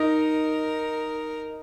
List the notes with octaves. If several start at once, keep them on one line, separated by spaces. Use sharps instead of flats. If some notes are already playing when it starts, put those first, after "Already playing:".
Already playing: D#4 A#4